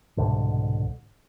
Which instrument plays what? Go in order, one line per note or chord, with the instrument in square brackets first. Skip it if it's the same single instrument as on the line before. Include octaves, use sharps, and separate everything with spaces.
[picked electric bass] C2 G#2 B2 D3